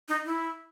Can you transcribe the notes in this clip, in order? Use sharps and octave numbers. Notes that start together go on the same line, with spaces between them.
D#4
E4